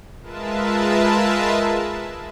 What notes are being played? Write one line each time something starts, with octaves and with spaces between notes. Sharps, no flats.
G#3 F4 A#4 B4 E5 A5